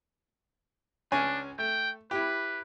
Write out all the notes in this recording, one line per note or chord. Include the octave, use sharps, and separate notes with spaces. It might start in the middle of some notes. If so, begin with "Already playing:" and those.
C#2 C#4 D4 G#5
A3 G5
E4 G4 B4